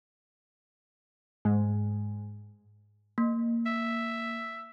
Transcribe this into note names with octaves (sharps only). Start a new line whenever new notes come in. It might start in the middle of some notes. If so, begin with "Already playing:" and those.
G#2 G#3
A#3
E5